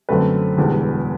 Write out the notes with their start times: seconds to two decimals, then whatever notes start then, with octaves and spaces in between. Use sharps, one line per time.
0.09 F#2 D3 A3 C4 B4
0.57 E1 E2 D3 G3